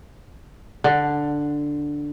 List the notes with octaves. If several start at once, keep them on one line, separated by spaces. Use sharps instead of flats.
D3